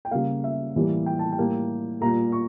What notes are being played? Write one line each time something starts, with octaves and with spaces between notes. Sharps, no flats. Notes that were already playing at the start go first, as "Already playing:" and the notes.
G5
C#3 G3 A#3 F5
E5
A2 E3 G3 A#3
G5
A5
G5
A2 G3 A#3
A#2 G3 A#3 A#5
C#6